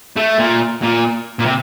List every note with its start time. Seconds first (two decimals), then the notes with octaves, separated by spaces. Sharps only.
0.17 A3
0.39 A#2
0.83 A#2
1.39 A#2
1.46 C3